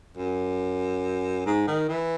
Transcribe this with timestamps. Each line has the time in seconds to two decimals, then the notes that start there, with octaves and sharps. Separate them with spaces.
0.17 F#2
1.46 G#2
1.67 D#3
1.89 E3